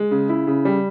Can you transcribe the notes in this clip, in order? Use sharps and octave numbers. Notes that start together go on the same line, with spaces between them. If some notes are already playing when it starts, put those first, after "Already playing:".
Already playing: G#3
C#3
E4
C#3
G3